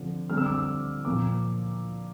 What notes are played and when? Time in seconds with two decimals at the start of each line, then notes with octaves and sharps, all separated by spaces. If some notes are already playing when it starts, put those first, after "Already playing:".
Already playing: D3 F3 C4
0.30 D3 G3 C4 F6
0.37 E6
0.46 D6
0.54 E6
1.05 A#2 F3 A#3 D6